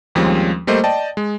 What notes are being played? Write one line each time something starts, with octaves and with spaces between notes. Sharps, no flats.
D#2 F3 G3 G#3 C4 C#4
G3 A3 A#3 C5 D#5
D5 D#5 G5 A5
G#3